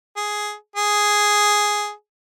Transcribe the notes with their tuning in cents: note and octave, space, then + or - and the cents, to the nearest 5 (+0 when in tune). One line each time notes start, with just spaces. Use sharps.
G#4 +5
G#4 +0